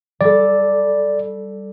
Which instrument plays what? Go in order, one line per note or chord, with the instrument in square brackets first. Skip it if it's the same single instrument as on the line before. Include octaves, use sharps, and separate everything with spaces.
[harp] G3 A4 [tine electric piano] D5